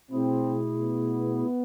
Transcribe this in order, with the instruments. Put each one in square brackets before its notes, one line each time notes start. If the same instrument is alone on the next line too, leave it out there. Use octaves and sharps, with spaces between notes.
[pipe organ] B2 A3 E4 G#4 [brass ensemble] C4
[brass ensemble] B3